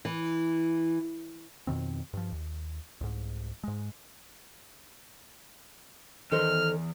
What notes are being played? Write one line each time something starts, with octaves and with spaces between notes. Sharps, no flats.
E3
F2 B2 D#3 C4
G2 F3
D#2
C2 G#2
G#2 G#3
E2 D#3 A4 C5 F6